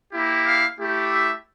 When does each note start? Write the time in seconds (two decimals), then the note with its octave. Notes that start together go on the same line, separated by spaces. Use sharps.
0.12 A#3 E4 G4
0.46 F5
0.79 A3 E4 G4
1.11 E5